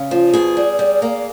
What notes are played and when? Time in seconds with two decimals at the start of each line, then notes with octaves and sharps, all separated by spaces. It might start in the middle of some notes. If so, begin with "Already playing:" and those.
Already playing: C#3
0.11 F3
0.34 B2 G#4
0.57 G3
0.79 G3
1.02 A#3